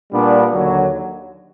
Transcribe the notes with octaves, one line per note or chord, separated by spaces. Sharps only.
A#2 G3 B3 D4
D#2 D3 F#3